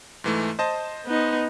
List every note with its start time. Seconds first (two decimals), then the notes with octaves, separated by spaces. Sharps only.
0.24 G#2 E3 A3
0.59 C5 D#5 A5
1.06 B3 D#4